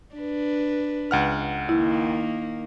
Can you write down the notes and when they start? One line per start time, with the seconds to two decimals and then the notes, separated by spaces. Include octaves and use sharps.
0.15 D4 B4
1.11 C#2 F#5 F6
1.69 D#3 A#3 E4